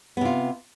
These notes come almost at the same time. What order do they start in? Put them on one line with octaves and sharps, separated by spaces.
B3 C3 F4